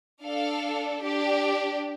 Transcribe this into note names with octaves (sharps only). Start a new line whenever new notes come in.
D4 A4 F5
D4 G4